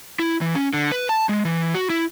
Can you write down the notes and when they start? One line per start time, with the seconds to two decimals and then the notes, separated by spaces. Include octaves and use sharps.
0.19 E4
0.41 E3
0.55 C#4
0.73 D3
0.92 B4
1.09 A5
1.29 G#3
1.45 E3
1.75 F#4
1.90 E4